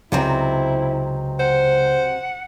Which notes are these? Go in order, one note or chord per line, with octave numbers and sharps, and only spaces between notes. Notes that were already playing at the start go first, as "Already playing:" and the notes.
C#2 C3 F#3 C4 E4 G#5 A#5
C5 F#5